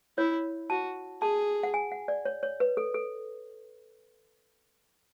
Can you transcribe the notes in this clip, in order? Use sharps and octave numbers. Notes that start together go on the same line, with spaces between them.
E4 C#5
F#4 A5
G#4 A5
F#5
G#5
F#5
D5
C#5
C#5
B4
A4
A4